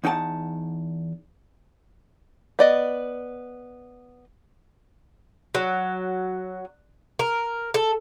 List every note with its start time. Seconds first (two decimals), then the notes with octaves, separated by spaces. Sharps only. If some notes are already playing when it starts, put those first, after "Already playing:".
0.04 E2 D#4 F#5 G5 A5
2.59 B3 D5 D#5
5.55 F#3
7.19 A#4
7.74 A4